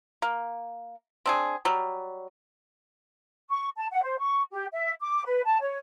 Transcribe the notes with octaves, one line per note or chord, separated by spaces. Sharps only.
A#3
C4 D4 G#4
F#3 G3
C#6
A5
F#5
C5
C#6
G4
E5
D6
B4
A5
C#5